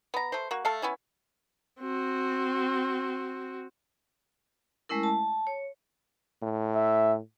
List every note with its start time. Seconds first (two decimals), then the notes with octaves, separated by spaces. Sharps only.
0.14 B3 A#5
0.32 A3 C5
0.51 A#3 F#4
0.65 A3 A4 F5
0.82 B3 C#4 E4
1.81 C4 F#4
4.89 G#3 A3 C#4 E4 A#4
5.03 A5
5.47 C#5
6.43 A2
6.75 E5